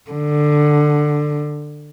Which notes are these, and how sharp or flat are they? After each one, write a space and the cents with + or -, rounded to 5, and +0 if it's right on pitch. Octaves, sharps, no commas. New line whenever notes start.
D3 +15